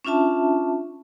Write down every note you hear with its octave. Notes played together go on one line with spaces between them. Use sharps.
C#4 D4 F4 E5 A5